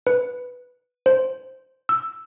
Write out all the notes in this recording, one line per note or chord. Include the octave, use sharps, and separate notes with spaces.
B4
C5
E6